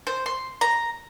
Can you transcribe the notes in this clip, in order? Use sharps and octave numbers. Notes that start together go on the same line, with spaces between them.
C5
C6
A#5